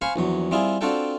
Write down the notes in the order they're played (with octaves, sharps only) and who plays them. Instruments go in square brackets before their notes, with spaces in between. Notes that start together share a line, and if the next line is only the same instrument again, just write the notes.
[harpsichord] C5 F5 G#5 B5 C#6
A#1 E2 F#3
G3 C4 E4 F4 G#4
C4 D4 F4 F#4 A4 G5